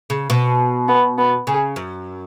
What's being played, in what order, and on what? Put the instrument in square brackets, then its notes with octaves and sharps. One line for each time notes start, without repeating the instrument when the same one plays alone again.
[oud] C#3
B2
[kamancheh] B3
B3
[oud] C#3 [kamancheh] G#4
[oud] F#2